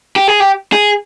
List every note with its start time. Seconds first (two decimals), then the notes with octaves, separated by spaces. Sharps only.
0.16 G4
0.28 G#4
0.40 G4
0.73 G#4